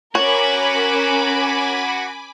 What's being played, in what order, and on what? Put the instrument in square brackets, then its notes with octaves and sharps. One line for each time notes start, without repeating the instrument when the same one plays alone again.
[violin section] C#4 A#4 [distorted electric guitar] F#4 [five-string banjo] C#5 [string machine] G#5 B5 D6